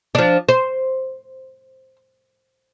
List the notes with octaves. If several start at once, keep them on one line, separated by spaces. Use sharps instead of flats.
F3 D4
C5